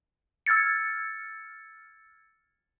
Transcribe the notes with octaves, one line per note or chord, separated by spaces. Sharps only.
E6 F6 G#6 A6 C#7